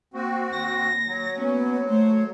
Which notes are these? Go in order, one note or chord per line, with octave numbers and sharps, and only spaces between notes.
A#3 C4 F#4
D#2 A#6
F#3
A#3 B3 C#4
A3 C5 C#5